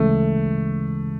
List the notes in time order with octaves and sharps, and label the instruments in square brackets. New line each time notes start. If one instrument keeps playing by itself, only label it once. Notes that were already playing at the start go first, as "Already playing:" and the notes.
Already playing: [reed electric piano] D2 C#3 E3 G#3 C#4 [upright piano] A3